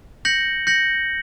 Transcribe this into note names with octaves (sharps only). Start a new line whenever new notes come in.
G6 A#6 C#7 F#7
G6 A#6 C#7 F#7